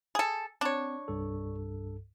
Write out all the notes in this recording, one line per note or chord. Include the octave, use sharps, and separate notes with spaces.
G#4 A4
C4 D4 C#5
C2 G2 A4